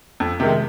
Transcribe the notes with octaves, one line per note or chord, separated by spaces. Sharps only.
F2
C3 D#3 G#3